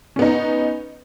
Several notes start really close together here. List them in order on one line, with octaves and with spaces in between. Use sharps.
C#4 B3 D#4